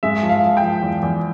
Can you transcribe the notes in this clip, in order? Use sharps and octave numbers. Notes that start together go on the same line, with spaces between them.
G#3 E5
F3
F5
F3
G5
F3
E2
E2